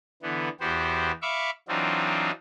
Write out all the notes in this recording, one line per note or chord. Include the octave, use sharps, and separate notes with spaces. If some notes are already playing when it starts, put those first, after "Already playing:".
D3 E3 B3
E2 B3 F#4 G4 C5
E5 F5 B5 C#6 D6
E3 F#3 C4 D4 D#4 F4